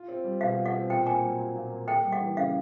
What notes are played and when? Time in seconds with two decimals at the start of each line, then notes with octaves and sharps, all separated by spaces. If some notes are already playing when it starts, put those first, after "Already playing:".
Already playing: F4
0.08 C4
0.24 G3
0.41 B2 F5
0.57 F4
0.66 F#5
0.74 C4
0.89 A#2 G5
1.06 A#3 G#5
1.22 F#3
1.39 A#2
1.55 A#2
1.71 A#3
1.88 A#3 G5
2.04 G3
2.12 F#5
2.21 E3
2.37 C#3 F5